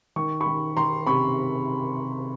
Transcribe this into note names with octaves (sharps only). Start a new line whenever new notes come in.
D#3 C#6
B5 C#6
D#3
D#3 A#5 C6
C3 B5 C#6